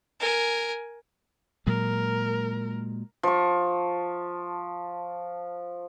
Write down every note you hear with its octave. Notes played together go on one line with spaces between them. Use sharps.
A#4 G#5
A#2 F#3 G#3 A#4
F3 C#6